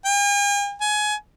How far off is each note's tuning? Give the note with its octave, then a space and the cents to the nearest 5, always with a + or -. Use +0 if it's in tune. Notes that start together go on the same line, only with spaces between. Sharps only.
G#5 -45
G#5 +20